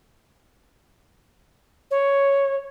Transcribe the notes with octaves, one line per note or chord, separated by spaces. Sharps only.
C#5